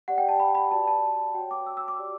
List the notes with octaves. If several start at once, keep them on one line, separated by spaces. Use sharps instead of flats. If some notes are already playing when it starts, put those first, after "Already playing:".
G4 D5 F#5
G5
A5
B5
B5
F#4 B4 D5 A5
A5
F#4 C#5 G5
D6
E6
E6
D6
G4 D5